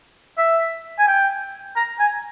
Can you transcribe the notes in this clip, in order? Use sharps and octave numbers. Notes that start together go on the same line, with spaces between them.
E5
G#5
G5
A#5
G#5